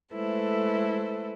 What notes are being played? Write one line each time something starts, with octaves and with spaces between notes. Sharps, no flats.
G#3 A3 E4 A4 B4 C5